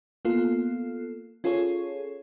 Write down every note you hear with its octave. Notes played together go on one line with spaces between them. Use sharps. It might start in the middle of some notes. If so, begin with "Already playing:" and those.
A#3 B3 F4 A4
C#4 F4 G#4 A4 C#5